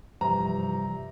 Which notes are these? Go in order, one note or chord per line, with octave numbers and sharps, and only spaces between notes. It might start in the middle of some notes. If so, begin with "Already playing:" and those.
G2 C3 E3 F3 G3 A#5